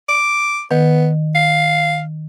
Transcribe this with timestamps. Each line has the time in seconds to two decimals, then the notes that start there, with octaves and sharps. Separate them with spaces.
0.09 D6
0.71 D#3 B3
1.35 F5